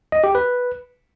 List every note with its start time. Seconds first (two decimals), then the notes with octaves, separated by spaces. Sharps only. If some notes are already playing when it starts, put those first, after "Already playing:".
0.12 D#5
0.24 G4
0.35 B4